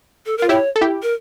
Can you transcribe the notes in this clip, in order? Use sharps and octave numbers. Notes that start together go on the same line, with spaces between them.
A4
F4 A#4
E4 G4 C#5
A4
E4 G4
A#4